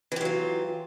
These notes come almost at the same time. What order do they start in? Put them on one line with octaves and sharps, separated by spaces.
E3 G4 F#3 F4